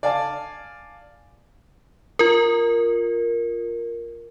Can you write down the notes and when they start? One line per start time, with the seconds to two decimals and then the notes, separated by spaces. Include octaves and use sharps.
0.03 D5 F5 G#5 A5 D6
2.19 F4 A#4